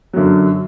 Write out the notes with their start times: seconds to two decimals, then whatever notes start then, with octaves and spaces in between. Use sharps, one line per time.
0.13 F#2 D3 F#3